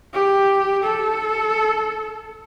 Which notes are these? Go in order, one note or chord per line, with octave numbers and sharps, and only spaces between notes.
G4
A4